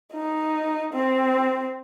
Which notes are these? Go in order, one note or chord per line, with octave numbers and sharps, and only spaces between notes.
D#4
C4